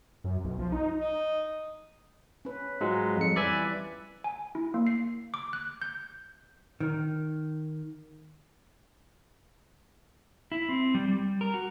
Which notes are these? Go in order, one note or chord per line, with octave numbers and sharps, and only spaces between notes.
F#2
B1
F3
D#4
D#4
C#4 B4
G#2 F#3 G#3 F4
F2 G3 C#7
E3 B4 D5 E5 G#5
G#5
E4
A#3
C7
D6
F#6
G6
D#3
E4
C4
G3
G3
A#4
F#4